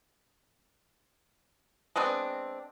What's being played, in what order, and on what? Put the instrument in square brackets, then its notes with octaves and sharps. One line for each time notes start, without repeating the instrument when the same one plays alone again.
[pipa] G#3 B3 C4 D4